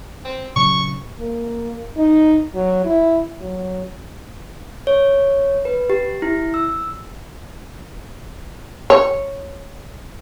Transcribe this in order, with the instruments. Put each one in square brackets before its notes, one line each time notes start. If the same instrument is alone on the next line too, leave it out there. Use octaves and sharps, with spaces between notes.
[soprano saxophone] C4
[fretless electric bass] A#2 C#3 F#3 [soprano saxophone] C#6
[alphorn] A#3
D#4
F#3
E4
F#3
[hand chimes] C#5
B4
G4
E4
E6
[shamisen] C#5